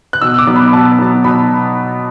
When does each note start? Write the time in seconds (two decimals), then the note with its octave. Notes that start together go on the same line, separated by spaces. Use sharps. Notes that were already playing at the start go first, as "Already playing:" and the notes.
0.13 F#6
0.21 B2 E6
0.39 D6
0.47 F#3 B3
0.56 B5
0.73 B2 A5
0.99 F#3 B3
1.24 B2 B5